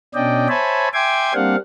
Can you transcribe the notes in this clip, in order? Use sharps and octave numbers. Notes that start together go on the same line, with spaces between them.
B2 C#4 D4 D5 D#5 G5
C5 C#5 E5 G#5 A5 B5
E5 G5 G#5 C6 D6 G#6
G3 A#3 C4 D4 F5 F#5